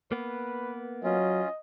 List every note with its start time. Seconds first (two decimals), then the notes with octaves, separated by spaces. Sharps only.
0.12 A#3 B3 B4
1.04 F#3 C#4 F4 D#5